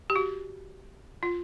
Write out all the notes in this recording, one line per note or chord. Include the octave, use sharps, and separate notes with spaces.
G4
F#4
F4